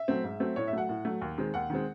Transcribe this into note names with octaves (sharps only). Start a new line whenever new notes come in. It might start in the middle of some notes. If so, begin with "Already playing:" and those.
Already playing: E5
F#3 A3 C4
G#2
F#3 A3 C4
A2 C#5
E5
F#3 A3 F#5
A2
F#3 A3
D#2
D#3 G#3 C4
D#2 F#5
D#3 G#3 C4